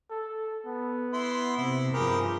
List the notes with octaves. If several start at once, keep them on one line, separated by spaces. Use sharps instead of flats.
A4
B3
E4 C6
C3 E4
G2 F3 G4 G#4 A#4 B4